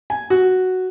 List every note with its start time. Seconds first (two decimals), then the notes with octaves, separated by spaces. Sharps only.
0.10 G#5
0.30 F#4